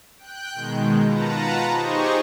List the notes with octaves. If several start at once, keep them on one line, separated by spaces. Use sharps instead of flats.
G5 F#6 G6
B2 D#3 G#3
F4 B4 F#5 A5 A#5
D#4 G4 G#4 C5 D#5 C#6